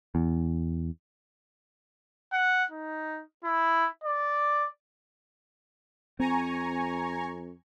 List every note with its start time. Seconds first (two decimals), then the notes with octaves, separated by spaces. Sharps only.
0.15 E2
2.32 F#5
2.71 D#4
3.44 E4
4.04 D5
6.20 F2 C4 G#5 A#5 C#6